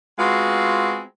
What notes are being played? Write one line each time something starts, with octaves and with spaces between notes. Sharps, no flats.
G#3 B3 C4 F4 F#4